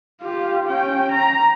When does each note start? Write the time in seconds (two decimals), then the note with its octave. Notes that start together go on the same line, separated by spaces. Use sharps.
0.21 F4 G4
0.68 C#4 G5
1.13 A#5